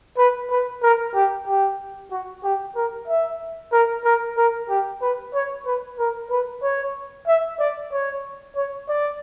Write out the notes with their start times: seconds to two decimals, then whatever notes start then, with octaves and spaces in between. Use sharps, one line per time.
0.18 B4
0.50 B4
0.82 A#4
1.14 G4
1.47 G4
2.11 F#4
2.43 G4
2.76 A#4
3.08 E5
3.72 A#4
4.05 A#4
4.37 A#4
4.69 G4
5.02 B4
5.34 C#5
5.66 B4
5.98 A#4
6.31 B4
6.62 C#5
7.27 E5
7.60 D5
7.92 C#5
8.56 C#5
8.89 D5